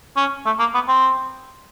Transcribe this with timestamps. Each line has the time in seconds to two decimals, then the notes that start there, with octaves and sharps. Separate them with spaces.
0.17 C#4
0.46 A3
0.59 A#3
0.74 B3
0.88 C4